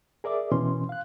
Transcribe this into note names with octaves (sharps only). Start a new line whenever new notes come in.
G#4 A#4 D5 E5 D6
B2 E3 C#4 C6
F5 F#6